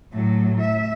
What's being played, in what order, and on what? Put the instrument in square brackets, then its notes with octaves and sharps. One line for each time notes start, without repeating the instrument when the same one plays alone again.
[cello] A2 F#3
E5